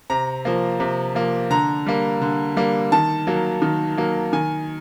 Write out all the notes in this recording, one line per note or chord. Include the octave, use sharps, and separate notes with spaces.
C3 A#5
F3 A#3
C3
F3 A#3
D3 A#5
G3 A#3
D3
G3 A#3
D#3 A5
F#3 A#3
D#3
F#3 A#3
D#3 G#5